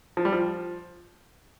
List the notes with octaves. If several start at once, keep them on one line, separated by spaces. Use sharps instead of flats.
F3
G3
F3